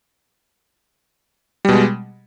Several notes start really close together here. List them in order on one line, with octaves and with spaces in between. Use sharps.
G3 B2 G#3